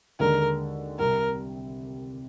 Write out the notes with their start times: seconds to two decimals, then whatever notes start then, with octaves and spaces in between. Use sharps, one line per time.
0.20 D#2 D3 G#3 A#4
0.99 C2 C3 G3 C4 A#4